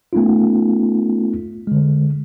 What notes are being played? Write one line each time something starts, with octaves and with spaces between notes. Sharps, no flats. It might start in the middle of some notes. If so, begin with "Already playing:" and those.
A3 B3 C#4 D#4 F4
D3 G#3